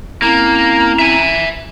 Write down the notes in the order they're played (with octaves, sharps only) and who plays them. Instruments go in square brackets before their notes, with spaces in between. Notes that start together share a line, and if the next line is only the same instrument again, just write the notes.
[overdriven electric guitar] A#3 [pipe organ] C4 C#4 E4 [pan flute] A#5
[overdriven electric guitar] E5 G#5